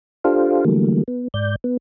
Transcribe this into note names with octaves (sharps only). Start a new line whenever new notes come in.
D4 F4 G4 A4 C5 F5
D3 E3 F#3 G3 A3 A#3
B3
G#2 D5 G6
B3